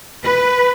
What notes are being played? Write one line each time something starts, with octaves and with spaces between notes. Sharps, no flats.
B4